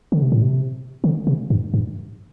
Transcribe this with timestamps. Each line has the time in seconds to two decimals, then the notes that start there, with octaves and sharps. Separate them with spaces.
0.12 D3
0.22 C3
0.32 A2
0.42 C3
1.04 D3
1.27 C3
1.50 G2
1.74 G2